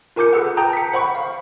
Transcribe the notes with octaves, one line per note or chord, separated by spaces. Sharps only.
F4 A#4 G#5 D6 G6 C#7
G#4 A4 B4 F#5
G5 A5 A#5 D#6 G6
B6 C#7
C5 F#5 B5 C#6
F5